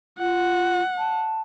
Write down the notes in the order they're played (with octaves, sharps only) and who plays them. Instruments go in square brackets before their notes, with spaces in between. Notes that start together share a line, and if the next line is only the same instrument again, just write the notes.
[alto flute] F4 [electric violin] F#5
[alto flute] A5